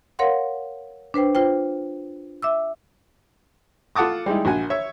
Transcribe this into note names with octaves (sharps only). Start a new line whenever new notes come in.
A#4 C#5 F5 F#5 C6
D4 B4 C5 G5
F4 C5 G5
E5 D6 E6
F4 A4 F#5 A5 D6 D#6
G3 G#3 D#4 E4
A#1 F#4 G#5
C#5 E5